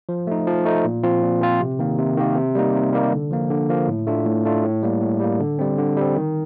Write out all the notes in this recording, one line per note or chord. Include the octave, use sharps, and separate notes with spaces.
F3
A3 D#4
F3
A3 D#4
A#2
F3 C4 F4
A#2
F3 C4 F4
C3
D#3 A#3
C3
D#3 A#3
C3
G3 A#3 D#4
C3
G3 A#3 D#4
D3
F3 A#3
D3
F3 A#3
A2
A3 D4 F4
A2
A3 D4 F4
A2
G3 A#3
A2
G3 A#3
D3
G3 C4
D3
G3 C4
D#3